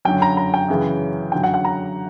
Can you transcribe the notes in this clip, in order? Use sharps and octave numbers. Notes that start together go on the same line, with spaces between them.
F#2 D3 F#3 G5
A#5
A#5
G5
F#2 C#3 E3
F#2 D3 F#3 G5
F#5
F#5
A#5